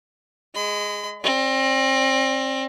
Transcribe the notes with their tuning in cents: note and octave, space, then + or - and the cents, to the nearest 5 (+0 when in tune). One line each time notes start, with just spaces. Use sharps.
G#3 +0 B5 +45
C4 +30 D5 +0